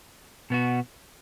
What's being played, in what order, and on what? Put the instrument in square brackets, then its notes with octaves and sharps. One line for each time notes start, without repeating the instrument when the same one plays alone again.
[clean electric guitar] B2 B3 F#4